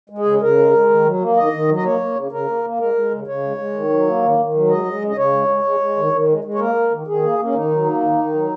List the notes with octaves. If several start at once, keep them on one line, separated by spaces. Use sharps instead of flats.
G#3
G#4
C#3
C#3 A#4
G#3
G#3
D#3
F#3
A#3
D#3 D#5
D#3
F#3
D#5
A#3 C#5
A#3
C#3
C#3 A#4
A#3
A#3
G#3 A#4
G#3
C#3
C#3 C#5
G#3
G#3
D#3
F#3
A#3
D#3
D#3
F#3
G#3 D#5
G#3
C#3
D#5
C#3 C#5
G#3
G#3
G#3
G#3
D#3
D#3
G#3
G#3
C#5
A#3 A#4
A#3
D#3
D#3 G#4
A#3
A#3
C#4
D#3 D#4
F#3
A#3
D#3
D#3
F#3